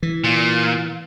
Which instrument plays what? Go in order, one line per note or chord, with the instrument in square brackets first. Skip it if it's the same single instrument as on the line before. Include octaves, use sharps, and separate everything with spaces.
[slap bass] E3
[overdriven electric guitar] A#2